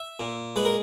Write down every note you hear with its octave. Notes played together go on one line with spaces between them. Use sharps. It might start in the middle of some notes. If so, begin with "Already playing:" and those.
Already playing: E5
A#2
G#3 B4
A#4